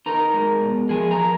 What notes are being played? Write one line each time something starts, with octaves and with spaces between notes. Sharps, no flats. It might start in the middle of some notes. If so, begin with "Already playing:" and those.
D#4 A#4 A#5
G#3
B2
F3 G#4 G#5
A#4 A#5
F3